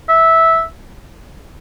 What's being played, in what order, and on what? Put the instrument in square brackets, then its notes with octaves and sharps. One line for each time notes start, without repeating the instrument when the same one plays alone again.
[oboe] E5